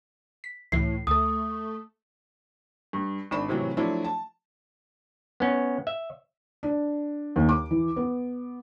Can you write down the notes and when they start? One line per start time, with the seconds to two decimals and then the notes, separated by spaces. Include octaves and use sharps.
0.44 B6
0.72 C#2 A2 E3 E4 C7
1.07 D2 A3 A4 D#6
2.93 G2
3.31 G#1 D4 B5 E7
3.48 A2 C3 E3 F#3
3.77 F3 F#3 A3 D4 E4
4.04 A5
5.40 B3 C#4
5.87 E5
6.63 D4
7.36 D#2
7.49 D6
7.71 E3
7.96 B3